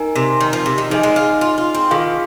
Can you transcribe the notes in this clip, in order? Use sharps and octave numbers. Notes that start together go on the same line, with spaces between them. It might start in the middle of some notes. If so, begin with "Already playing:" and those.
Already playing: D#4 A#4 G#5
C3
D#3
F3
C3
D#3
F3 D#4 G#4 D#5 G#5
G#3
F4
F4
F4
C4
D#3 F4 G#4 F5